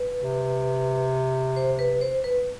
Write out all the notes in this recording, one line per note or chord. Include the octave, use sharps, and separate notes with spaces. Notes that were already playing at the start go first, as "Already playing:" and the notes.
Already playing: B4
C3
C5
B4
C5
B4